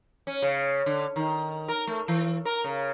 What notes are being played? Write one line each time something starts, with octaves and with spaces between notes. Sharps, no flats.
C#4
C#3
D3
D#3
A#4
A3
E3
A#4
C#3